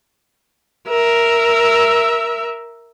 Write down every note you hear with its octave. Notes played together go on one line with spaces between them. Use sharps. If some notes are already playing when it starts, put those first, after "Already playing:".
A#4 E5